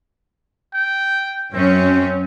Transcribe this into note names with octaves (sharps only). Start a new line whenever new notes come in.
G5
F#2 C4 C#4